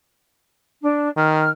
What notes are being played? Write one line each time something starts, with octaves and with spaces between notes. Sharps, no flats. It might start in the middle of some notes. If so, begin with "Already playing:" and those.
D4
D#3 F6